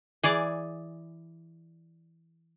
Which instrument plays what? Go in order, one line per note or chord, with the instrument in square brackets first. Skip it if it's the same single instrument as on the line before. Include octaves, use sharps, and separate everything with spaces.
[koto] E3 G#4 D5